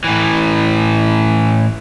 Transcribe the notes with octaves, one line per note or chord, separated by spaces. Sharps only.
A2 E3